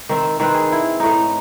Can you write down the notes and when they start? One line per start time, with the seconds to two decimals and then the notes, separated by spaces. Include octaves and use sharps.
0.09 D#3 C4 E5
0.40 D#3 C4 B4
0.54 G#4
0.72 E4
1.00 A2 D#4